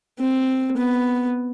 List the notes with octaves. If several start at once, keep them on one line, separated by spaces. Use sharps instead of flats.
C4
B3